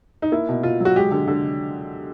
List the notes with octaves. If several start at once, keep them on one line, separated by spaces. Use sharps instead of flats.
D#4
A#3 E4
B2
B2 F4
F#3 F#4
G#3 G4
D3
D3